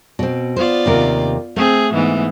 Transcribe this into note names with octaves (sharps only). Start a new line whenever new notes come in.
B2 C4
B3 F4 C5 D5
D#2 C3 A#4
A3 C4 G#4
G#2 E3 B3